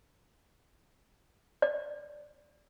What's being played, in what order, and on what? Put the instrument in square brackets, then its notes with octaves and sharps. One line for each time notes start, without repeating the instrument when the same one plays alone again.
[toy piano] D5